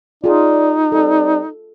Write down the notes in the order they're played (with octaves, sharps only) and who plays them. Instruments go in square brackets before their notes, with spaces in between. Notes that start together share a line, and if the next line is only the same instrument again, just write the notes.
[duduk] D#4 [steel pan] F4 G#4 [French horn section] D5
[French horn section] G3 C4 D5 [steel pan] A4